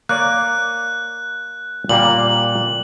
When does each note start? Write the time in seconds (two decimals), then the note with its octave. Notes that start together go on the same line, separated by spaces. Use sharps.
0.09 A#3 C#5 D5 F#6
1.89 A#2 G3 A#3 F#7